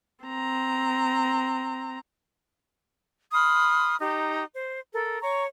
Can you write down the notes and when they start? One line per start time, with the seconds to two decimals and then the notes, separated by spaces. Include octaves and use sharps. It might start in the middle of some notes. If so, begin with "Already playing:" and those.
0.24 C4 A#5
3.32 B5 C6 D#6 F6
4.00 D#4 G4 A#5
4.53 C5
4.94 A4 A#4
5.22 C#5 A#5 C#6